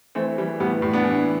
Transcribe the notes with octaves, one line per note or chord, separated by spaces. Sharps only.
E3 A3 C4
E3 G3
A2 G3 B3
A2
B3 D4
E3